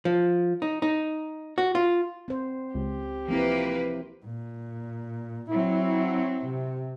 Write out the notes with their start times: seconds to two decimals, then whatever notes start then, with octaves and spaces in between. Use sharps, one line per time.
0.05 F3
0.62 D#4
0.82 D#4
1.58 F#4
1.75 F4
2.28 C4 C5
2.75 C#2 G4
3.28 F3 A#3 C4 E4 B4
4.25 A#2
5.51 F#3 C4 E4
6.42 C3